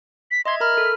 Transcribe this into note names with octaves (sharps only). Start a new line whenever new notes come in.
B6
D#5 E5 C6 G#6
A#4 A#5 B5 F6
A4 A#4